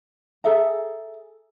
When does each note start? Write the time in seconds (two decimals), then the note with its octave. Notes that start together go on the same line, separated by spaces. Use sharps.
0.44 G#4 A4 E5 A#5